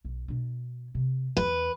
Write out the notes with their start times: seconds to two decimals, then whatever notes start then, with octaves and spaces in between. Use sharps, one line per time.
0.05 B1
0.28 B2 D4
0.95 C3
1.37 E2 E3 B4